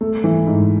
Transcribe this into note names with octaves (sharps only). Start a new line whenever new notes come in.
A3
E3
G#2